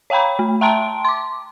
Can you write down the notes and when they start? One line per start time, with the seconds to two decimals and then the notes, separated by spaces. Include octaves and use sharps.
0.10 C#5 F5 G5 A#5 B5
0.39 A3
0.61 E5 G5 A5 A#5 C6 D7
1.05 C6 D6